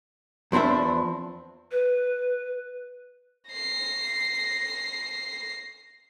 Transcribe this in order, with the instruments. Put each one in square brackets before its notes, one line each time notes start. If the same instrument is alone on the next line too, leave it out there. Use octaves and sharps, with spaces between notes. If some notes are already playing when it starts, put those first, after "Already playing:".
[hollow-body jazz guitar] E2 F3 C4 D4 E5
[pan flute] B4
[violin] A#6 C7